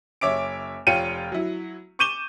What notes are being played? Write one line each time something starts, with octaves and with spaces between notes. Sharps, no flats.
F#1 C#5 E5 D6 D7
F1 F4 C#5 G5 C#7 D#7
F#3 E4
C#6 D6 G6 D#7 E7 G7